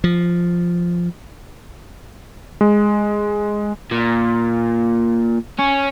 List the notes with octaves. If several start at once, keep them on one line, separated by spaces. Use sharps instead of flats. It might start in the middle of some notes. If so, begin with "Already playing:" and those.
F3
G#3
A#2
C#4